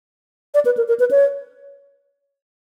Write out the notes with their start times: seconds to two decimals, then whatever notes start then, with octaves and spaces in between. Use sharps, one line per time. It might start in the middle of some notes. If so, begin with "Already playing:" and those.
0.54 D5
0.65 B4
0.77 A#4
0.88 A#4
1.00 B4
1.11 C#5